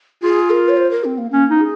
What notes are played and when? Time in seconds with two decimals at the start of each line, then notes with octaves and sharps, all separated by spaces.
0.23 F4 G#4
0.50 A#4
0.69 C#5
0.77 C5
0.91 A#4
1.04 C4
1.18 A#3
1.31 A#3 C#4
1.50 D#4
1.58 G#4